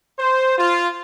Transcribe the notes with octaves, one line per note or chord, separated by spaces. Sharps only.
C5
F4